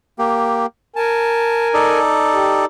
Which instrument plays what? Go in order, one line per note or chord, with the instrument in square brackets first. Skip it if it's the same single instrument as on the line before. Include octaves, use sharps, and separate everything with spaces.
[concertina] A#3 G4
[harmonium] A#4 G#5 [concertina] A5
[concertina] D#4 A4 D5
[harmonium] G4